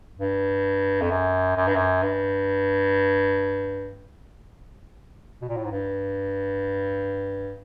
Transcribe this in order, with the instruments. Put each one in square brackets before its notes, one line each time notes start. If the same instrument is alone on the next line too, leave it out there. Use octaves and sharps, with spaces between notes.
[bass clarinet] G2
F2
F#2
F#2
G2
F#2
G2
B2
A#2
A2
G#2
G2